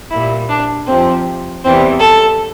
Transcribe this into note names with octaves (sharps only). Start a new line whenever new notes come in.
A#2 G3 E4
D4
F2 C3 F3 C4
E2 E3 G3 C4
A4